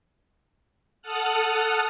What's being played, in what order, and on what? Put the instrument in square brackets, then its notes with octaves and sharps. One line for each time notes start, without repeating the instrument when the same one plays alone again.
[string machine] A4 F#5 A5 D#6 F6 F#6